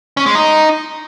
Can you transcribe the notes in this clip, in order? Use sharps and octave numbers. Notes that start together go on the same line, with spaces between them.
C#4
G#3
D#4